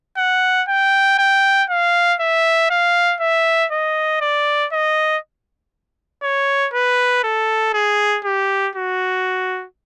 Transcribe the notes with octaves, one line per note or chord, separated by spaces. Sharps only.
F#5
G5
G5
F5
E5
F5
E5
D#5
D5
D#5
C#5
B4
A4
G#4
G4
F#4